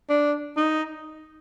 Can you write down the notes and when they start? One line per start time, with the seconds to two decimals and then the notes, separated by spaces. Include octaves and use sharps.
0.09 D4
0.57 D#4